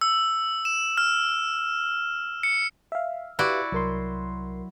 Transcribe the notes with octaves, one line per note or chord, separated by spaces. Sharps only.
E6
E7
F6
C#7
E5 F5
E4 F#4 G4 B4 D5
C2 F#3 A#4 C6